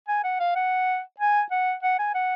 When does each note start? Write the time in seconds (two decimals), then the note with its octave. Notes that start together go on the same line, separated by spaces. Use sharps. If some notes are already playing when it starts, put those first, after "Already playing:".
0.08 G#5
0.24 F#5
0.40 F5
0.56 F#5
1.20 G#5
1.51 F#5
1.83 F#5
1.99 G#5
2.15 F#5